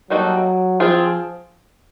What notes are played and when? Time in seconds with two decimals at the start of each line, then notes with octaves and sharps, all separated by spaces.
0.10 F#3 G3 A#3 D#4 F#4 A4
0.80 F3 C4 F4 G#4